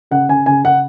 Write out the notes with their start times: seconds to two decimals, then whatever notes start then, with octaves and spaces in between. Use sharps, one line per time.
0.11 C#3 F#5
0.29 C#3 G#5
0.46 C#3 G#5
0.64 C#3 F#5